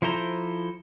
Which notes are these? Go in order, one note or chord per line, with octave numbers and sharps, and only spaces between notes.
F3 E4 A4 C5 A#5